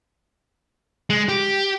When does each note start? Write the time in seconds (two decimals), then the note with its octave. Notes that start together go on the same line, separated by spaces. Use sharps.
1.10 G#3
1.29 G4